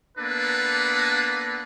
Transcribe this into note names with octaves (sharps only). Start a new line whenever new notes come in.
A#3 B3 D4 A4 B4